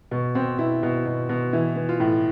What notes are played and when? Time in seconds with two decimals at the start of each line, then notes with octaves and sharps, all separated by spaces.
0.11 B2
0.35 B2 C4
0.58 B2 E4
0.83 B2
1.05 B2
1.29 B2
1.53 E3 E4
1.76 E3
1.89 F4
2.00 A2